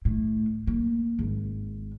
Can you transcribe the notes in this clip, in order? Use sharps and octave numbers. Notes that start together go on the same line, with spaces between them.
A2
A#3
G#1